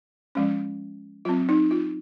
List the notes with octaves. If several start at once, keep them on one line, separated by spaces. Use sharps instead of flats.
F3 G#3 C#4
F#3 C4 F4
D#4
F4